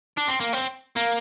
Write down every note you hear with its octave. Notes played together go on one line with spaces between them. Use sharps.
D4
C4
A#3
C4
A#3